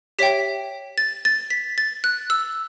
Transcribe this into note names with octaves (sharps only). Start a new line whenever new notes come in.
G4 C#5 E5 G5 B6
A6
A6
B6
A6
F#6
E6